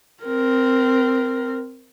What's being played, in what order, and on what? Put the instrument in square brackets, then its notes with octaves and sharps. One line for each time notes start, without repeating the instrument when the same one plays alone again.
[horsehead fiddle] C4 A#4